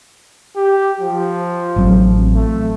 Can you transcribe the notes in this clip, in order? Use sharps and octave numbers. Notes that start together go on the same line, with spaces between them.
G4
F3
A1 F#3 C4
A3